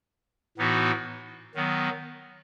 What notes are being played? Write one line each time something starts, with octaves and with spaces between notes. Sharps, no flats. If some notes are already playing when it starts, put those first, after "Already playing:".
A2 E3 B3 D#4 F#4
D#3 F#3 B3